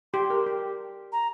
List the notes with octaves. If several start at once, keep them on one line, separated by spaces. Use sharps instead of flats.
G4 C6
A#4
G4
A#5